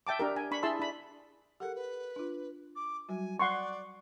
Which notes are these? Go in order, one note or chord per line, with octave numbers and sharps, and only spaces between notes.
E5 G5 A5 D6
D4 G4 A#4
G#5
D4 B5 C#6
E4 G#4 E5 A5 C6 E6
D4 B5
G4 A4 A#4 F#5
B4
D4 F4
D6
F#3 G3 F#4 G#5
D5 F#5 C6 C#6